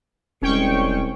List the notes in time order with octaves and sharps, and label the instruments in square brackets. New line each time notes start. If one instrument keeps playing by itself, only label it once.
[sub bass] E1 [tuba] C2 [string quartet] G#3 [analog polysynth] C#4 G5 C#6